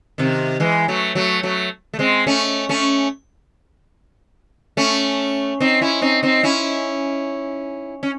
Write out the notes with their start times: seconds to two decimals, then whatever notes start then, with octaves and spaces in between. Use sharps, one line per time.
0.18 C3 D#3
0.60 E3 G#3
0.88 F#3 A3
1.15 F#3 A3
1.43 F#3 A3
1.94 A3
1.99 G#3 C4
2.27 A3 C#4
2.69 A3 C#4
4.77 A3 C#4
5.60 C4 D#4
5.81 C#4 E4
6.02 C4 D#4
6.23 C4 D#4
6.43 C#4 E4
8.03 C#4